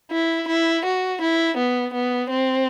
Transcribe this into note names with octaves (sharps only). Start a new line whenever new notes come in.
E4
E4
F#4
E4
B3
B3
C4